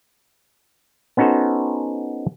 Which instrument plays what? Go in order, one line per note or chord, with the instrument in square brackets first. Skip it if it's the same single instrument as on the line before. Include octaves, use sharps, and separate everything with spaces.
[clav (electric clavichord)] B3 C#4 D#4 F#4 A4 C5